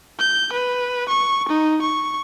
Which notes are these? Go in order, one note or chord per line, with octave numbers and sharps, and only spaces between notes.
G6
B4
C#6
D#4
C#6